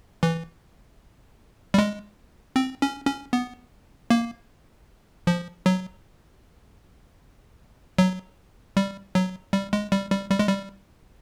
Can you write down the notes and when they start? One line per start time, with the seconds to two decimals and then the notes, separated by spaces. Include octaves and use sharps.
0.23 E3
1.74 G3
1.78 G#3
2.56 C4
2.82 C#4
3.07 C#4
3.33 B3
4.10 A#3
5.27 F3
5.66 F#3
7.98 F#3
8.77 G3
9.15 F#3
9.53 G3
9.73 G#3
9.92 G3
10.12 G3
10.31 G3
10.39 G#3
10.48 G3